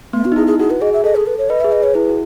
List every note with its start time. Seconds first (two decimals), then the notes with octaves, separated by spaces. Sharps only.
0.13 A3 B3
0.25 F#4
0.32 D#4
0.36 E4 G#4
0.47 G#4
0.59 F#4 G#4
0.70 B4
0.81 G#4 D#5
0.93 E5
1.04 A4 D#5
1.16 G#4
1.27 B4
1.38 C#5
1.49 B4 D#5
1.61 E5
1.64 G#4
1.72 D#5
1.79 G#4 C#5
1.94 E4 B4
2.09 F#4